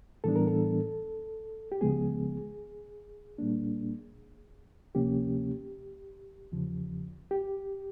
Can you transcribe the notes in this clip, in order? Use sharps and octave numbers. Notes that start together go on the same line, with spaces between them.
A2 E3 G3 B3 D4 A4
A#4
A4
G4
C#2 C#3 F3 G#3 B3 G#4
A#2 G3 A#3 D4
D2 C3 F3 A#3 C#4 G4
E2 C#3 F3
G4